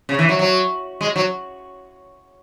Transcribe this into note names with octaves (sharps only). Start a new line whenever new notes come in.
C#3
E3
F#3
F#3
G#3
F#3